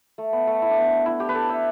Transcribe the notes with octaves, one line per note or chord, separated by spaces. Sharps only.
A3
B3
A3
E4
D4
B3
D4
E4
G4
B4
A4
E5